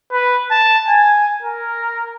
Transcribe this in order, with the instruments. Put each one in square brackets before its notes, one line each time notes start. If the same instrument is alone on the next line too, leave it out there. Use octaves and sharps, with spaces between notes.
[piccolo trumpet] B4
A5
G#5
A#4